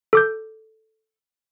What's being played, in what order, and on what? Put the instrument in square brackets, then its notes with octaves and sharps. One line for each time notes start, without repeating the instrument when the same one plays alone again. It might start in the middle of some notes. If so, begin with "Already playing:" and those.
[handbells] A4 D6 G6